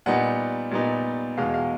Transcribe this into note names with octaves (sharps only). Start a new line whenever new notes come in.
A#2 G3 B3 D#4 F#5
A#2 G3 B3 D#4
E2 B2 G#3 F5
F5